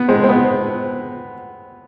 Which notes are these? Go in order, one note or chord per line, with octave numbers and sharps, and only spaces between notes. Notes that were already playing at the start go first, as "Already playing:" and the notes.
Already playing: B3
G#3 C4
C4
B3